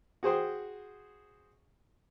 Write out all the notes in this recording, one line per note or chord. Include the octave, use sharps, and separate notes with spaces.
F#4 G#4 C5 G5